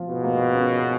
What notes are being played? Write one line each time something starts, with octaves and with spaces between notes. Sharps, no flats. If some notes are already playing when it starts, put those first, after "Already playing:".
Already playing: F3 F4
G#2 B2
A#3
C#4